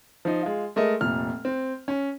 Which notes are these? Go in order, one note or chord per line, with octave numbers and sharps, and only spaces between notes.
F3 D#4
G#3 F4
G#3 A3 A#4 D#5
F1 A#2 F6
C4
C#4